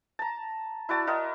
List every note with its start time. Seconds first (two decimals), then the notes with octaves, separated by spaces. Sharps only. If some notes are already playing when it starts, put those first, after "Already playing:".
0.19 A5 A#5
0.89 E4 F#4 D5 A5
1.07 E4 F#4 A#4 D#5